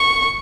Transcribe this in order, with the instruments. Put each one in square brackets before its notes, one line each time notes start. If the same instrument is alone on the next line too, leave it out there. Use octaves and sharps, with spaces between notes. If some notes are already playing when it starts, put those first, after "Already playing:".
Already playing: [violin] C#6